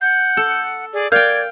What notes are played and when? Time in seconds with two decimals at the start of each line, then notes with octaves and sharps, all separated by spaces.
0.01 F#5 G6
0.37 A4
0.93 G#4 D5
1.12 A#4 D5 F5 G5 G6 G#6